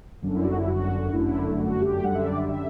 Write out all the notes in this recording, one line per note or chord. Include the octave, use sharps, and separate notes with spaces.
G1 F#2 D3
E4
F#4
E4
F#4
G1 F#2 D3 A3 E4
F#4
G4
F#2 D3 G3 F#5
E5
D5
E5
E5